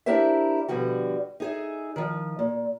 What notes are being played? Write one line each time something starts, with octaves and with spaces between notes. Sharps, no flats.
D4 E4 G4 A#4 C5 E5
B2 D3 F3 G3 F#4
D#4 G#4 E5
D#3 F3
A#2